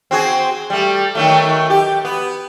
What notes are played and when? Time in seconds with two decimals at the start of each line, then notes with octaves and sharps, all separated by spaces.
0.11 C4 F#4 G#4
0.70 G3 A3
1.15 D#3 F#3 A3
1.70 G4
2.05 B3